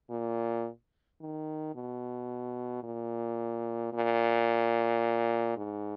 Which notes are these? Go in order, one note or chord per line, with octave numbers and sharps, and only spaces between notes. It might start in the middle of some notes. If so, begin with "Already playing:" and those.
A#2
D#3
B2
A#2
A#2
G#2